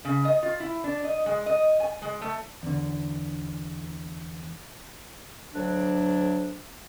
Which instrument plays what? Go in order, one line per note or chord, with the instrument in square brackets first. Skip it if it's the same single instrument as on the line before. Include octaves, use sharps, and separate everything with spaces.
[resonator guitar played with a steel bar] C#3
D#5
F4
E4
D4
D#5
G#3
D#5
G#5
G#3
A3
[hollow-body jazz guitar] E2 D3
[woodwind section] D2 F#3 D4